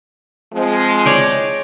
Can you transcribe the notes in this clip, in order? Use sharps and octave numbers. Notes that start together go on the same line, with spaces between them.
F3 G#3 C4
C#5 D5 G5